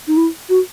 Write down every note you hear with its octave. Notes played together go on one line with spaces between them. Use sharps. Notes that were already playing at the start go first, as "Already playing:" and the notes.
D#4
E4
F#4